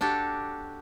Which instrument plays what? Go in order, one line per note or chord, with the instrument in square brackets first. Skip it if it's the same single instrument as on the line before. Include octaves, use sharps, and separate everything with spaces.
[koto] D4 F#4 G4 A4